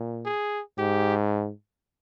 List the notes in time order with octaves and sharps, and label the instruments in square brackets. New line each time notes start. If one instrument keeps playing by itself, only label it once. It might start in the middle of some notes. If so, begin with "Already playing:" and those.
Already playing: [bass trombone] A#2
[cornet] G#4
[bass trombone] G#2 [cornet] G4